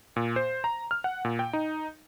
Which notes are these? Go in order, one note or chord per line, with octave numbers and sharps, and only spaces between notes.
A#2
C5
A#5
F6
F#5
A#2
G5
D#4